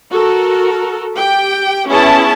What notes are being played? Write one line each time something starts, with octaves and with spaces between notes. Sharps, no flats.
F#4 A4 A#4
G4 G5
B3 C#4 E4 G#4 A5